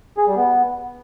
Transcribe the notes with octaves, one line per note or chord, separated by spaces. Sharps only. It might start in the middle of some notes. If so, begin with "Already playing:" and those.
G#4
G3
B3